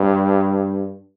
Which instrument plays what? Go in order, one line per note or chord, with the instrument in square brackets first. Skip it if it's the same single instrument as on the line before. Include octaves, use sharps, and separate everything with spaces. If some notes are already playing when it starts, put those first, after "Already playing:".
Already playing: [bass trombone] G2